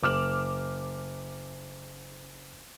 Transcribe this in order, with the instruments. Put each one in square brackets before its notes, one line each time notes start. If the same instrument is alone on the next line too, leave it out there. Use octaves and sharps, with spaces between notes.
[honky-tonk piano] F#1 D6 F6 E7 F#7